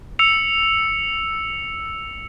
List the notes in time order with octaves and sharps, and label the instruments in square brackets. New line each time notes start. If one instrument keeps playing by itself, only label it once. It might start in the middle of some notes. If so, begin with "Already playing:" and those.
[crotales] E6 C#7 F7